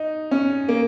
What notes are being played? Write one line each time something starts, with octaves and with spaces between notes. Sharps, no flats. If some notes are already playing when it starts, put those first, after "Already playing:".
Already playing: D#4
C#4
A#3